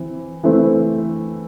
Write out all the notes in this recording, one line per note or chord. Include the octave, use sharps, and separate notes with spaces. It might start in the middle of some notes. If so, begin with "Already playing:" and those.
Already playing: E3 C4
E3 A3 C4